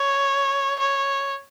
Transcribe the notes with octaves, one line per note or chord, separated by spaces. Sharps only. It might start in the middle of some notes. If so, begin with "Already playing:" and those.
Already playing: C#5
C#5